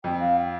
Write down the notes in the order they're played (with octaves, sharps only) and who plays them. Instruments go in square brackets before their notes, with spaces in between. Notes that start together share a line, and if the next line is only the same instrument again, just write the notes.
[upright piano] F2 [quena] G5
[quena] F5
G5